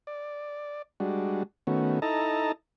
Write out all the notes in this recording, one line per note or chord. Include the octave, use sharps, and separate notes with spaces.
D5
G3 G#3 D4 F#4
D#3 A3 B3 C#4 F#4
D#4 E4 A4 D#5 A5 A#5